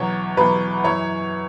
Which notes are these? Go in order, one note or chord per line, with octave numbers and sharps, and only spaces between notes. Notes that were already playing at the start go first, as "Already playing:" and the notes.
Already playing: E2 B2 F#3 C#5
E2 B2 F#3 B4
F#2 E3 C#5